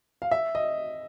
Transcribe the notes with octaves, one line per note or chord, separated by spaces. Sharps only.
F5
E5
D#5